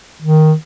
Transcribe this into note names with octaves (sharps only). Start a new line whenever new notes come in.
D#3